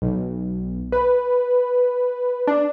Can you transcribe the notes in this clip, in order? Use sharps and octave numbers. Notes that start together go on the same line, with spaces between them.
B1
B4
D4